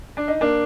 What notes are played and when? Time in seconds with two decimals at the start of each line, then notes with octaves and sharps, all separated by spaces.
0.17 D4
0.28 D#4
0.41 A#3 D4